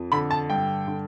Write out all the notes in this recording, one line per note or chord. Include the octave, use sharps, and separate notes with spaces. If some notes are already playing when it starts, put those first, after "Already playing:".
Already playing: F2
D3 B5
A5
G2 G5
D3